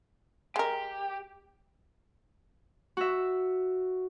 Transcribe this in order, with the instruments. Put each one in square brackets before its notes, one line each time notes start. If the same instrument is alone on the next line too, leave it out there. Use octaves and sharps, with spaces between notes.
[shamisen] G#3 A#4 [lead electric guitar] G4
[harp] F#4 E5